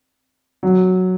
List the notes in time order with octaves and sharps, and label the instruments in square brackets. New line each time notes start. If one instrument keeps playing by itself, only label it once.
[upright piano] F#3